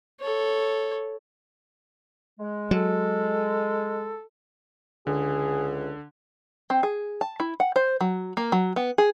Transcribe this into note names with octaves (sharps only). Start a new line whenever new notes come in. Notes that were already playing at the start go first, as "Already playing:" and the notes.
A4 C#5
G#3
F#3 A4
C#2 D3 G#4
C4
G#4
A5
E4
F#5
C5
F#3
A#3
F#3
B3
G#4